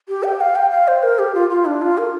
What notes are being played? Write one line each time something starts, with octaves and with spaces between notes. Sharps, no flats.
G4
G5
F5
G5
F5
C5
A#4
G4
F4
F4
D4
F4
A#4